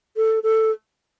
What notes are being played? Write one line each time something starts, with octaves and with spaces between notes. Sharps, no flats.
A4
A4